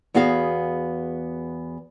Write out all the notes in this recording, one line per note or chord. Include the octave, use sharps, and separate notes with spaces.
E2 B3 F#4 G#4 F5